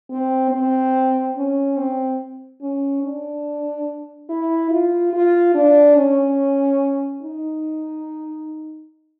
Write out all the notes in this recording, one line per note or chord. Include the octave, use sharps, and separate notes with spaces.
C4
C4
C#4
C4
C#4
D4
E4
F4
F4
D4
C#4
D#4